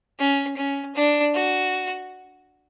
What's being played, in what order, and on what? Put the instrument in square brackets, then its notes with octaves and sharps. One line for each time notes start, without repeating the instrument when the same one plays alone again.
[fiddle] C#4
C#4
D4
F#4